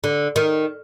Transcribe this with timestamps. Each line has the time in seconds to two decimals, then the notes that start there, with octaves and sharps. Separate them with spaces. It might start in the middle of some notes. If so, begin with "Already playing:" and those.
0.04 D3
0.36 D#3